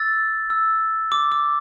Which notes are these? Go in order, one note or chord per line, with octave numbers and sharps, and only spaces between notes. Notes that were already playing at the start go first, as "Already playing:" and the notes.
Already playing: E6 A6
E6
D6
D6